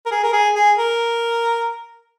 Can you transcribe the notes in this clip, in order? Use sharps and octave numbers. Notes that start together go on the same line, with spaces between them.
A#4
G#4
A#4
G#4
G#4
A#4